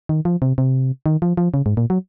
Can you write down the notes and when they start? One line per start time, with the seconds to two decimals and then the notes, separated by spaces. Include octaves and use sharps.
0.09 D#3
0.25 F3
0.42 C3
0.58 C3
1.06 D#3
1.22 F3
1.37 F3
1.54 C#3
1.66 G#2
1.77 A#2
1.90 F#3